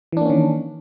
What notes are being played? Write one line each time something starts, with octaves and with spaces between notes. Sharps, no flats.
D#3 E3 A#3 C#4 D4